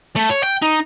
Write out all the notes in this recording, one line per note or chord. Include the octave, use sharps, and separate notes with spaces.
A3
C#5
G5
D#4